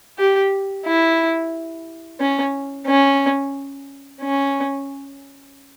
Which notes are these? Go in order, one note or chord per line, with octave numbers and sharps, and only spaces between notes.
G4
E4
C#4
C#4
C#4